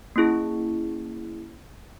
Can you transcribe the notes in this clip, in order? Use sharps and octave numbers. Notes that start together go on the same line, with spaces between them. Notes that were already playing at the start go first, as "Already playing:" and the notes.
A#3 C#4 E4 G#4